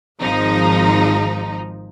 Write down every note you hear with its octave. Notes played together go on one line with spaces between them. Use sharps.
G#1 F3 D#4